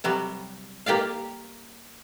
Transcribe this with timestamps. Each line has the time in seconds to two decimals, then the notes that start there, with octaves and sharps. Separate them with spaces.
0.04 C3 F#3 G3
0.86 A#3 G4 D5 F5